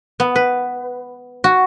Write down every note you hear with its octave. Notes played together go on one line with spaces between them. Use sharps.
B3
B4
F#4